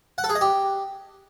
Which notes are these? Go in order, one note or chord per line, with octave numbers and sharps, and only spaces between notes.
F#5
A4
G#4
D#5
G4